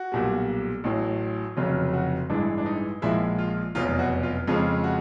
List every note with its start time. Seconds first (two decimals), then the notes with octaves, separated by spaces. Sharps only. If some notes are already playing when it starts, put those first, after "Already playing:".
Already playing: F#4
0.12 B1 A#2 G3
0.84 A1 A2 F#3
1.57 F1 F2 C#3 F#3 F4
1.93 F#4
2.29 A1 G2 E3 G#3 D4
2.58 D4
2.66 D#4
3.02 A#1 A#2 F3 G#3 E4
3.38 F4
3.75 F1 E2 B2 F#3 F4
3.99 F#4
4.23 F4
4.47 F2 C#3 F3 G#3 F4
4.84 F#4